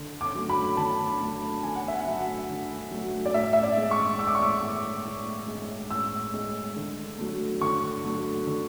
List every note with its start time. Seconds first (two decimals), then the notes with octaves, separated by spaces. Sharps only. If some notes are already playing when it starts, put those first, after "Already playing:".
Already playing: D3
0.21 D6
0.35 F#3 A3
0.49 B5
0.77 D3 A5
1.21 F#3 A3
1.63 D3 G#5
1.75 F#5
1.88 E5
2.00 F#5
2.06 F#3 A3
2.49 D3
2.91 F#3 A3
3.26 D5
3.34 A2 E5
3.53 E5
3.63 D5
3.77 G#3
3.91 C#6
4.19 A2 E6
4.27 D6
4.35 C#6
4.43 D6
4.63 G#3
5.05 A2
5.48 G#3
5.90 A2 E6
6.33 G#3
6.76 D3
7.18 F#3 A3
7.61 D3 C#6
8.05 F#3 A3
8.47 D3